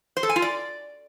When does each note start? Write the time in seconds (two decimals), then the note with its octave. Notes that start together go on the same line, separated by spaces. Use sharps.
0.17 C5
0.23 A4
0.29 G#5
0.36 F4
0.42 D5